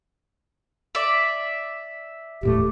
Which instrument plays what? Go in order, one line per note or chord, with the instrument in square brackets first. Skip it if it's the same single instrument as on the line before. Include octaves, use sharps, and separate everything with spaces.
[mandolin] D5 E5
[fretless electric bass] D#1 A2 A3 [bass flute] G4